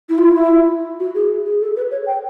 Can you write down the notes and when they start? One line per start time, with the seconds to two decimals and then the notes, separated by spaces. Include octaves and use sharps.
0.09 E4
0.18 F4
0.27 E4
1.00 F#4
1.15 G#4
1.46 G#4
1.61 A4
1.76 B4
1.91 C#5
2.06 G5